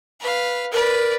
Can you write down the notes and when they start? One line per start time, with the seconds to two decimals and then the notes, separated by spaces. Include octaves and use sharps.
0.21 B4 F5
0.72 A#4 B4 D5